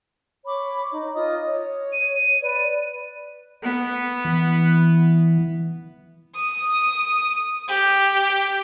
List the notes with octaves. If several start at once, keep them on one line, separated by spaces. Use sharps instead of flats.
C#5 B5 D6
D#4
F4 D#5 D#6
C#5
D#7
B4 D5
B3
E3
D#6
G4